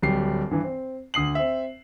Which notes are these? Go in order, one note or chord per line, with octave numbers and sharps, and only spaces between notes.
D1 G3 C7
G2 E3
C4
D2 D#6 C7 F#7
C4 E5